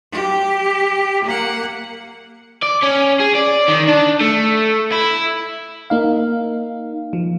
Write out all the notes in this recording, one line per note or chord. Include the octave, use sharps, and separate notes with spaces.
G4
A#3 F#5
D5
C#4
G#4
D5
D#3
D4
A3
E4
A#3 D#4 F5
F3